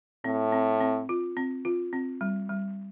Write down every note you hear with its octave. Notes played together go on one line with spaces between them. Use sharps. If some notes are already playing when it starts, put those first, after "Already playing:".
A2 C4
C4
C4
F4
C4
F4
C4
G3
G3